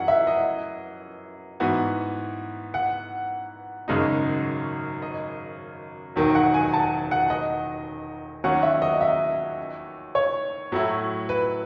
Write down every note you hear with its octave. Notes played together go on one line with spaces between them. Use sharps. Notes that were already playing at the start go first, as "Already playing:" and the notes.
Already playing: F#2 E3 F#5
E5
D#5
G#2 E3 B3 F#4
F#5
G#1 F#2 C#3 G#3 D#4
D#5
E1 D#2 D#3 F#3
F#5
G#5
A5
F#5
D#5
D#2 D#3 F#3 C#4 F#5
E5
D#5
E5
C#5
A2 F#3 A3 E4
B4